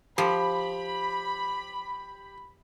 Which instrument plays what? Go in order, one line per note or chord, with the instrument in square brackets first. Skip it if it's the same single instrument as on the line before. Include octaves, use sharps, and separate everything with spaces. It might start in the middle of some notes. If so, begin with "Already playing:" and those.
[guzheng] F3 [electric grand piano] G4 [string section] B5